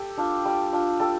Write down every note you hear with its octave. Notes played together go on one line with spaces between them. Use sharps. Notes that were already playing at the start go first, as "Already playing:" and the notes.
Already playing: G4 A4
D4 F4
G3
D4 F4
G3 A4